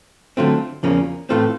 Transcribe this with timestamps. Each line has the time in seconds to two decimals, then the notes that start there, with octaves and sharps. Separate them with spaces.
0.37 D3 F#3 A3 C4 F4
0.83 E2 C#3 F3 A#3 C#4
1.29 A2 E3 A3 C4 F4